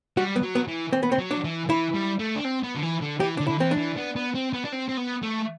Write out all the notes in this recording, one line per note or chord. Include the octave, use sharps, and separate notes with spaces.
G3 F#4
B3
F#3
B3
E3
C4
B3
C4
F#3
D4
E3
E3 E4
G3
A3
D4
C4
B3
D3
E3
D3
E3 G4
D3 D4
E4
D3
E3 C4
D4
E3
B3
B3
C4
B3
D4
C4
C4
B3
A3